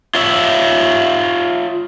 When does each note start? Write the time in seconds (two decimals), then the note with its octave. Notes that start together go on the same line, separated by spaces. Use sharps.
0.15 F4 C#5 E5